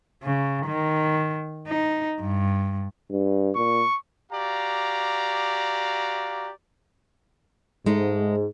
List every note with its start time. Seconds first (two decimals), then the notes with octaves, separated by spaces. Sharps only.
0.24 C#3
0.67 D#3
1.68 D#4
2.20 G2
3.11 G2
3.56 A#2 C#6
4.31 F#4 G4 D5 F5 A#5
7.86 G#2 G#3 A3 D#4